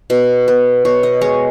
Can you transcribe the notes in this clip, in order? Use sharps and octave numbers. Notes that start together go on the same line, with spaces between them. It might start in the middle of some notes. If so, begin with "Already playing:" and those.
B2
B3
B2 C#5
D#5
G#3 C#5